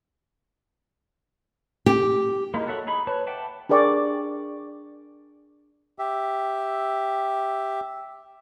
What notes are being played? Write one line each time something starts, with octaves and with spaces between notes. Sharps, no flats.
G4
G#3 A#3 D#4 E4
F#4 A4 C#5 E5 F#5
D#4 G#4 B5
B4 C#5 A5
E5 F#5 G5 A5 D6
D4 G#4 A#4 D5 G5 C#6
G4 E5